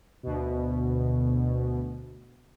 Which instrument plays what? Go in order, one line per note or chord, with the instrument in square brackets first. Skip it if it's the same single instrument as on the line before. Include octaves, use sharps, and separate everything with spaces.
[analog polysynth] D2 B2